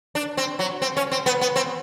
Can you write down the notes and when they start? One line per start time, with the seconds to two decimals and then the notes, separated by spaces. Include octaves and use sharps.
0.15 D4
0.37 C4
0.59 F#3
0.82 C4
0.97 C#4
1.12 C4
1.26 B3
1.41 B3
1.56 C4